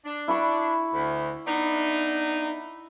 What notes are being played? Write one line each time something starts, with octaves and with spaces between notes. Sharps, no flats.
D4
E4 B5 C#6
D2
B3 D4 D#4